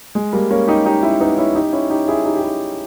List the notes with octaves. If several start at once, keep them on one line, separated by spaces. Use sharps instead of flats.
G#3
G3 A#3
A#3 C#4
D#4 G4
D#4 G4
C#4 E4
B3 D#4
C#4 E4
D#4 G4
C#4 E4
D#4 G4
E4 G#4
D#4 G4
G4
E4 G#4